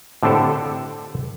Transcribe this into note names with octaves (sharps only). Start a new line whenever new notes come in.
A2 D3 C4 D4 G4 A4